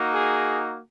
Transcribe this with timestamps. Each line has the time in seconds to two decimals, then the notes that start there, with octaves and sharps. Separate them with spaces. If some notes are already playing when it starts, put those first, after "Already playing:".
Already playing: A#3 D#4 F#4
0.14 G#4